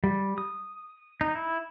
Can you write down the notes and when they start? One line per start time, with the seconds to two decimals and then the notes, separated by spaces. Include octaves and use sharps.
0.04 G3
0.38 D#6
1.21 D#4
1.35 E4